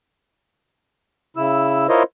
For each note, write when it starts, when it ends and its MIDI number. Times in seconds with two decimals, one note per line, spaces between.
1.37 1.87 49
1.37 1.87 64
1.37 1.87 88
1.89 2.03 64
1.89 2.03 65
1.89 2.03 70
1.89 2.03 72
1.89 2.03 73
1.89 2.03 75